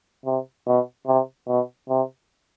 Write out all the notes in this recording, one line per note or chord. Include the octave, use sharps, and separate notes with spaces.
C3
B2
C3
B2
C3